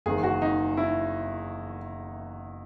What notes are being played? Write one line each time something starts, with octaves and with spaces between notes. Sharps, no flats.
F#1 E2 D#3 G#4
F#4
D#4
E4